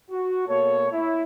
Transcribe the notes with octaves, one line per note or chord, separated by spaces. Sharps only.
F#4
B2 A#3 A4 C#5
E4